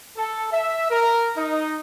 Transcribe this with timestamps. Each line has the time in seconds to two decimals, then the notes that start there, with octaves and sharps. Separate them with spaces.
0.17 A4
0.52 E5
0.90 A#4
1.37 D#4